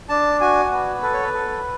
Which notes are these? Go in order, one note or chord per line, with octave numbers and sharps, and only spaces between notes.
D4 A5
F#4 G#5
B3
A4 B4
C#5
B4
A4